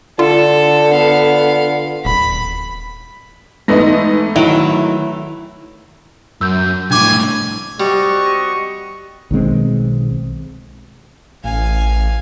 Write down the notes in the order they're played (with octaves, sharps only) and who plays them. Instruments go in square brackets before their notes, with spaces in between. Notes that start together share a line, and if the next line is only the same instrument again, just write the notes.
[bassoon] D3 [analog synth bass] F4 [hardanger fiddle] A4
[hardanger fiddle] B3 F5
[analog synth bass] D#1 [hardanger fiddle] B5
[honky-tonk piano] G#2 B3 D#4 [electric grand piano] E3 A3 A#6
[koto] D#3 F#3 [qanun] E4 [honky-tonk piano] E5
[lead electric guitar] F#2 [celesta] E6 G6
[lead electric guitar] C2 A2 [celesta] D4 D6 [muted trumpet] G#5
[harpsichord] G3 [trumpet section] C4 F#4 D#5 [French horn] G4 [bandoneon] C#6
[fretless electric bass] B1 D#3 G#3 C4
[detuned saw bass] A1 [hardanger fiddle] F5 G#5